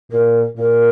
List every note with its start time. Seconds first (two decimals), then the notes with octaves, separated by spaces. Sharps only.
0.11 A#2 A#4
0.57 A#2 A#4